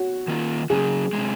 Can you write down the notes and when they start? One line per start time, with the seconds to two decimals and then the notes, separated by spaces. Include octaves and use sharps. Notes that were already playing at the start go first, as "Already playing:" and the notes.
Already playing: F#4 C#5
0.28 D#3 A#3 F4
0.70 C#3 F#3 C#4 F#4 G#4
1.13 D#3 G#3
1.18 C3